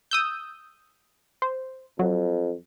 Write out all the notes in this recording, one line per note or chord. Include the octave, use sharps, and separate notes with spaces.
D#6 E6 G6
C5
F2 F#3